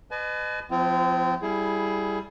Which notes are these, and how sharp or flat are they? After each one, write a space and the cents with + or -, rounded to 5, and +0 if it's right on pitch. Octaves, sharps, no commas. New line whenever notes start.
B4 +30 D#5 -30 G#5 +45
F3 +15 C4 -30 F4 -40
G3 +0 E4 +0 G#4 +20